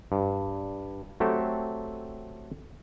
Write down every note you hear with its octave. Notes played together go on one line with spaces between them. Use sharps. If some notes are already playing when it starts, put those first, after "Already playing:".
G2
F#3 A3 C4 G4 A4